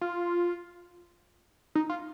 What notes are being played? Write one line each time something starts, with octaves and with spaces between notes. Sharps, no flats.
F4
D#4
F4